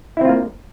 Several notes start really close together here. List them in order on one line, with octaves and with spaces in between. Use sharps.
E4 C4 F4 A#3